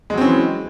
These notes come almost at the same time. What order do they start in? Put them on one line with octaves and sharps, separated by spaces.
G#3 F#3 C4 C#4 E3